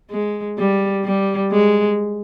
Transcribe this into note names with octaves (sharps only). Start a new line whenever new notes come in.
G#3
G3
G3
G#3